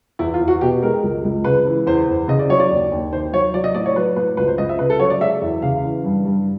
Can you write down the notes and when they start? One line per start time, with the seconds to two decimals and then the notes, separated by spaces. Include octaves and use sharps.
0.19 E2 E4
0.34 F4
0.40 E2
0.48 F#4
0.61 B2 G4
0.83 G#3 A#4
1.03 C#2
1.24 C#2
1.45 C#3 B4
1.66 E3
1.87 E2 C5
2.07 E2
2.28 C#3 D#5
2.39 D5
2.50 F#3 C#5
2.60 D5
2.71 D#2
2.92 D#2
3.12 D#3 C5
3.33 F#3 C#5
3.54 F#3 D5
3.64 D#5
3.74 A2 D5
3.86 C#5
3.96 F#3 B4
4.16 A2 B4
4.37 C#2 B4
4.48 C5
4.58 C#2 D#5
4.69 E5
4.79 C#3 B4
4.90 A4
5.00 F#3 C#5
5.10 D5
5.21 G#3 E5
5.42 E2
5.62 C#3 F5
5.84 E3
6.04 G2
6.25 G2